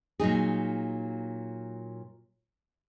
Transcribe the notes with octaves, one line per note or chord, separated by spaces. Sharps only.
A#2 F#3 D#4 G#4